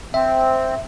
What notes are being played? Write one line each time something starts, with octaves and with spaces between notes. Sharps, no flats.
C4 E5